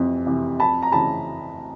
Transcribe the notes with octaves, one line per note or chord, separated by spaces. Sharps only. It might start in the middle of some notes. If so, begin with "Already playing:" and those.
Already playing: F2 C3 E3
C3 E3
F2 A5 B5
A#5
C#3 E3 A5 B5